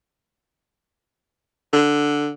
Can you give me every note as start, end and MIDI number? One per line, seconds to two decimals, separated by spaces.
1.73 2.30 50